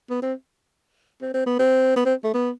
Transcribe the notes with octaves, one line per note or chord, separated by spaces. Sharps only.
B3
C4
C4
C4
B3
C4
B3
C4
A3
B3